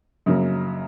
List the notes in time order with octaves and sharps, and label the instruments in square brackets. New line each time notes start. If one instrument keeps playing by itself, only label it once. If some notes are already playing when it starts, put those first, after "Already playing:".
[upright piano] F#2 C#3 F#3 A#3